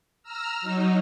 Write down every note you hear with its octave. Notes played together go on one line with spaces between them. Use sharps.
A#5 E6 F6
F#3 D#4